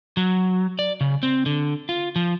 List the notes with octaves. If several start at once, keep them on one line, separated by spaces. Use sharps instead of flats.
F#3
D5
C#3
C4
D3
F4
F3